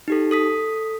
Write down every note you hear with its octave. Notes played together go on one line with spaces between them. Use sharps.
D#4 G4 A4
A4 D#6 B6